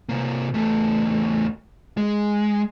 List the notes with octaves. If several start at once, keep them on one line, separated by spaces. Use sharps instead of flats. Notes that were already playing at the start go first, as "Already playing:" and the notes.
C3 A#3
E2 A3
G#3